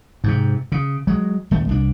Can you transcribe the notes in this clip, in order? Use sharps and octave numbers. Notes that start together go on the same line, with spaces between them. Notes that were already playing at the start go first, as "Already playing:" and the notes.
G#2 C3
C#3
F#3 G#3
D#1 A3
C2 D4